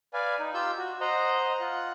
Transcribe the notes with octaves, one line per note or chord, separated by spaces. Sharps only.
B4 D5 F5 G#5
D#4
F4 G4 E6 G6
F#4
C5 D#5 F#5 A#5
F4 F#5 F#6